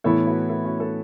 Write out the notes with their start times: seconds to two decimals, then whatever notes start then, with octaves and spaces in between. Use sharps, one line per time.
0.04 A2 E3 B3 E4 A4 C#5
0.27 F#4 B4
0.49 E4 A4
0.65 C#4 F#4
0.79 A4 C#5